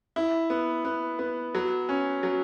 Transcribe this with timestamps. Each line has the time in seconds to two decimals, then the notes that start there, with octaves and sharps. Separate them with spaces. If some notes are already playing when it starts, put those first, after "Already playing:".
0.16 E4
0.50 B3
0.85 B3
1.19 B3
1.55 F#3
1.89 C#4
2.23 F#3